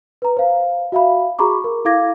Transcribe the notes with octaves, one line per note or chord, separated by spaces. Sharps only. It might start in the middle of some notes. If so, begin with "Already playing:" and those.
B4 A#5
C5 F5
F#4 E5 F5 B5
F#4 G#4 A#5 B5 C#6 D6
A#4
E4 A4 F5 D6 G#6 A#6